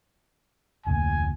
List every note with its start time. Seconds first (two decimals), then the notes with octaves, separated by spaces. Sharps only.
0.86 F1 D2 A#2 G#5